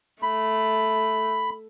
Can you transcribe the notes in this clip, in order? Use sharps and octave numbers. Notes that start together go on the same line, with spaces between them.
A3 B5